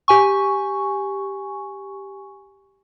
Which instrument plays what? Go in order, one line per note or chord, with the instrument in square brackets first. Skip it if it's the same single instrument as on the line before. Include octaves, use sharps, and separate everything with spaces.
[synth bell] G4 G#5 C#6